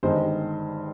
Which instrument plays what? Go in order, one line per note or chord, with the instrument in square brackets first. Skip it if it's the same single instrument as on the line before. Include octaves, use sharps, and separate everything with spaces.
[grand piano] G1 G2 D#3 G#3 C5